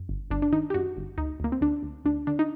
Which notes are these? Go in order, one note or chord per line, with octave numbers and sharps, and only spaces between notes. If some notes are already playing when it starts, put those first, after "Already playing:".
Already playing: F#2
G1
G1 D4
D4
D#3 D#4
G4
F#2 F#4
G1
D2 D#4
D2 A#3
C4
D2 D4
D2
D2 D4
D3 D4
D#4